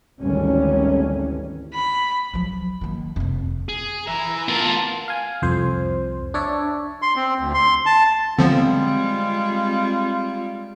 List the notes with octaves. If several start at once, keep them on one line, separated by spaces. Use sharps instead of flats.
G#1 D2 D3 E3 G3 C#4
B5
F3 F#3
D#3 A#3
F1 C3
G#4
E3 E5 A#5
B3 F4 A#4 A5
F5 G#5
C2 F2 C5
D4 C#5 D5 E5
C6
C4
D2
C6
A5
D3 F3 G3 G#3 B3 C4 F4